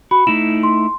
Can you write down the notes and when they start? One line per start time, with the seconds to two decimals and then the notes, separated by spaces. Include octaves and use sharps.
0.11 F#4 B5
0.27 A3 D#4 E4 E7
0.63 C6